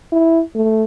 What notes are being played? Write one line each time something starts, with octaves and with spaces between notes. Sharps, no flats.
E4
A3